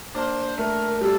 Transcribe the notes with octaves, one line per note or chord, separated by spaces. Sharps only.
A#3 D4 C5
A3 A#4
G3 A4